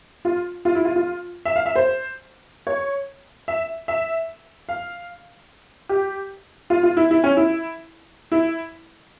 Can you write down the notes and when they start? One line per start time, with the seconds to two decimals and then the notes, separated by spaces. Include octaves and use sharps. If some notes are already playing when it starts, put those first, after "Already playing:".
0.25 F4
0.65 F4
0.75 E4
0.85 F4
0.96 F4
1.45 E5
1.56 F5
1.66 E5
1.76 C5
2.67 C#5
3.48 E5
3.88 E5
4.69 F5
5.89 G4
6.70 F4
6.83 F4
6.97 E4
7.11 E4
7.24 C#4
7.37 E4
8.32 E4